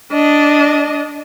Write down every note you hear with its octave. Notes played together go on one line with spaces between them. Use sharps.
D4 D#5